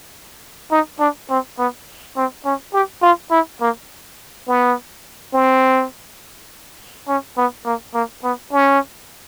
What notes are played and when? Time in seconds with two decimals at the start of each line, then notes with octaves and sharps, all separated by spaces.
0.72 D#4
1.00 D4
1.30 C4
1.59 B3
2.17 C4
2.46 C#4
2.73 G4
3.02 F4
3.31 E4
3.61 A#3
4.48 B3
5.34 C4
7.08 C#4
7.37 B3
7.66 A#3
7.94 A#3
8.24 B3
8.53 C#4